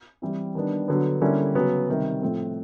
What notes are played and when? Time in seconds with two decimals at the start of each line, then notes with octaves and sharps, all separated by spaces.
0.22 E3 G3 C4 E4
0.55 D#3 G3 B3 D4
0.88 D3 F#3 B3
1.22 D3 G3 A#3 C#4 E4
1.55 C#3 F#3 B3
1.88 C3 D#3 G3
2.22 A2 F3 A3 C4